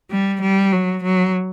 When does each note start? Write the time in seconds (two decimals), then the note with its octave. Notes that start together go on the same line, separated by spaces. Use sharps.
0.11 G3
0.42 G3
0.72 F#3
1.03 F#3